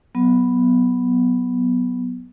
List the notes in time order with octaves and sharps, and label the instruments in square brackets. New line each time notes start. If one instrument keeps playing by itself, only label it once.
[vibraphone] F#3 B3